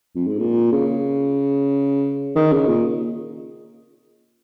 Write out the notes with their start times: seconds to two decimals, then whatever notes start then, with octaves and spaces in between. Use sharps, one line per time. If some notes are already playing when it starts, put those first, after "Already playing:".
0.15 F2
0.27 G#2
0.39 A#2
0.72 C#3
2.36 D#3
2.52 C#3
2.68 A#2